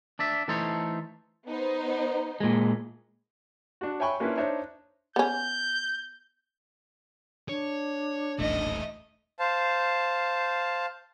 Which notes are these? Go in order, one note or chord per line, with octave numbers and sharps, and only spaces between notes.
D4 D5 E5
E3 A3 D#4 A4 C5 C#5
B3 D#4 C5
A#2 G#3
D4 F#4
C#5 E5 G5 G#5 B5 C#6
A#3 C#4 D4 E4 F4 B4
D4 D#4 C5 C#5 E5
B3 C#4 G6
D4 C#5
D#1 A1 A3 D#4 D#5
C5 F5 A5